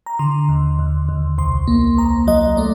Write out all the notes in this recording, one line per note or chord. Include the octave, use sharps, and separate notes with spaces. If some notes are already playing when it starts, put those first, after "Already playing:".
A#5
D3 C6
D#2
D#2
D#2
C2 C6
A#3
C2 A#5
F#3 D#5
A3 D5